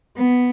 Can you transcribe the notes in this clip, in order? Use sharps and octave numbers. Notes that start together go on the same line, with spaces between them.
B3